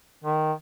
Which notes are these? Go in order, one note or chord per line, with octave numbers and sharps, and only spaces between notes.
D#3